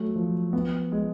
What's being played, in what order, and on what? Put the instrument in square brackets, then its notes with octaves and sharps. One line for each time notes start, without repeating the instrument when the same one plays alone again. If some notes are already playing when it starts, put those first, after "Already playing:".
Already playing: [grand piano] F#3 A3
F3
B3
G#3